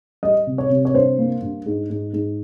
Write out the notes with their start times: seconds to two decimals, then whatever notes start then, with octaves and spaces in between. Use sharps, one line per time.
0.23 G3 D#5
0.47 C3
0.58 C#5
0.70 C3
0.85 C#5
0.94 G2 C5
1.19 A#3
1.42 G2
1.66 G#2
1.90 G#2
2.13 G#2